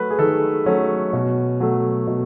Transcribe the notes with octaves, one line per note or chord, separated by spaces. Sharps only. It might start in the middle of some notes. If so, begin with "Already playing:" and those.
Already playing: F#3 A3 B4
G#4
D#3 A4
F#3 A3 C#4
B2
F#3 A3
B2